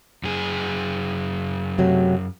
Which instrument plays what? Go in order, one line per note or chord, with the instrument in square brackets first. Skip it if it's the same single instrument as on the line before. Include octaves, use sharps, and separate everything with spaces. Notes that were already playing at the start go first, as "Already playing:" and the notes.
[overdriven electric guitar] F#2 G#4
[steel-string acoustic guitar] C3 F#3 A3